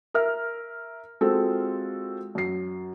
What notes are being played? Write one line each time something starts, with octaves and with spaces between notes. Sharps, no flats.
A#4 E5 F6
G#3 C4 F4 F#4 A4
F#2 C7